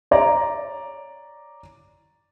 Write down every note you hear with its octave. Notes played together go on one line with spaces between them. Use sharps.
C#5 D5 A#5